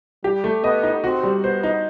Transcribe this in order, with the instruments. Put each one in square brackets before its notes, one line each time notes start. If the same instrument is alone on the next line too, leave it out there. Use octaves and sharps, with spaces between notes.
[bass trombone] G3 [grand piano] G4
[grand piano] A3
[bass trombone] B3 [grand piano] D#5
[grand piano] D#4
[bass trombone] C4 [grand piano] F#4
[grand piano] G3
[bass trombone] B3 [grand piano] C5
[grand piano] D#4